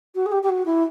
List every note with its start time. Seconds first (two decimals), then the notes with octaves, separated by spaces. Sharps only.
0.15 F#4
0.25 G#4
0.31 G4
0.43 G4
0.48 F#4
0.65 E4